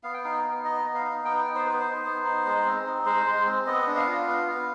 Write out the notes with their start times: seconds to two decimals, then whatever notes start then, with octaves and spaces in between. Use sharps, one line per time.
0.03 B3 F5
0.14 G5
0.24 D#4 F5
0.44 B3
0.64 D#4 D#5
0.85 B3
0.94 F5
1.04 D#4
1.24 B3 G5
1.45 D#4
1.55 C5
1.65 B3 B4
1.79 C5
1.85 D#4
2.05 B3
2.25 D#4
2.46 G#3
2.66 C4
2.86 D#4
3.06 G#3 C5
3.26 G#3
3.46 C4
3.66 B3 D#5
3.87 D4 D#5
3.96 F5
4.07 F4
4.27 B3
4.47 B3